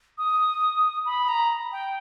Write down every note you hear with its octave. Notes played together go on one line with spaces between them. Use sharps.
D#6
B5
A#5
G5